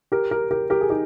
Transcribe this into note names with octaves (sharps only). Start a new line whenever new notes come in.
G4 A#4
G4 A#4
G4 A#4
G4 A#4
G#4
D#4 G4